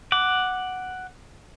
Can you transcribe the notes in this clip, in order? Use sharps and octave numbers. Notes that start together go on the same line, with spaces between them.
F#5 D6